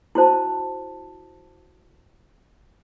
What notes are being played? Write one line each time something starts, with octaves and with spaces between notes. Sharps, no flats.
E4 F#4 C5 A5